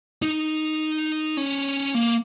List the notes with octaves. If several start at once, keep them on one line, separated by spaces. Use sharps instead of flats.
D#4
C#4
A#3